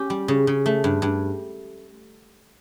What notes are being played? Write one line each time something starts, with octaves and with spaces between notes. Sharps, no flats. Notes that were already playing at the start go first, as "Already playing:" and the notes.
Already playing: C#4 G4
G3
C#3
C#3
A3
G2
G2